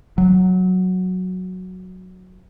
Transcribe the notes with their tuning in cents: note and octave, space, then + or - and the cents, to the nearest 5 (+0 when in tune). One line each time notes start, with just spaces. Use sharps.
F#3 -5